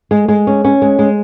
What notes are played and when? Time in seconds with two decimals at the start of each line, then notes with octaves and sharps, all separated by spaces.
0.11 G#3
0.28 G#3
0.47 C#4
0.64 C#4
0.82 G#3
0.99 G#3